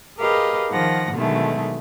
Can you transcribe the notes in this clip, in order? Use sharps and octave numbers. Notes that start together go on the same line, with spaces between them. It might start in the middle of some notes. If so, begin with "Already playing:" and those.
G4 G#4 A#4 B4 D#5 F5
D#3 F3 F#5 A#6
B2 D3 D#3 F#3 G#3 A3